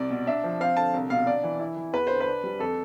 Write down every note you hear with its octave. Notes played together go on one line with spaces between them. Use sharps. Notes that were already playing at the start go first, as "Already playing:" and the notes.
Already playing: C2 D5
B2
D4 E5
F3
C4 F5
D3 A5
C2
B2 F5
D4 D5
E3
E4
E3
E2 B4
D3 C5
B4
D4
G3
F2 A4